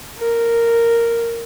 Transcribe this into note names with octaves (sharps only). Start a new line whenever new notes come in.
A#4